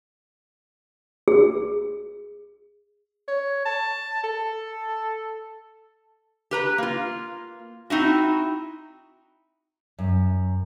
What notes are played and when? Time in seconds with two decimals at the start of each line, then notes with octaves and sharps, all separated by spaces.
1.28 G#4
3.28 C#5
3.65 A5
4.24 A4
6.51 G4 B4 A#5
6.78 A#3 F4
7.90 C4 D#4 E4 F#4
9.99 F#2